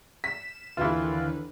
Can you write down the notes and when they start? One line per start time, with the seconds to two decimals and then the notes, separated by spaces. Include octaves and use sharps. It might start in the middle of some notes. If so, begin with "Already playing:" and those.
0.24 B6 E7
0.77 D#2 D3 E3 F4 B4